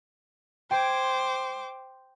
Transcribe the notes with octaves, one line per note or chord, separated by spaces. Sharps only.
C5 G5 C6 D6 G#6